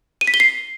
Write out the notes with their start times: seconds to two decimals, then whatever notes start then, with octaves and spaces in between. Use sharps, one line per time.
0.21 D#7
0.27 B6
0.34 G7
0.40 C7